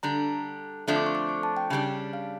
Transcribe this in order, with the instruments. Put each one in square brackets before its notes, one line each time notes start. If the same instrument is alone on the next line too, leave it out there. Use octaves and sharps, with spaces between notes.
[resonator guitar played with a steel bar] D3 G3 D4 [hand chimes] A#5
[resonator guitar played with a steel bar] F2 D3 F3 A3 D4
[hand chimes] D6
C#6
D6
C#6
A5
G5
[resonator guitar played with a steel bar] C#3 G3 D4
[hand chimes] F5